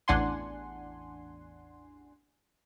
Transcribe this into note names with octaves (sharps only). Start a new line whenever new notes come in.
A1 E2 D4 F#5 G#5 C6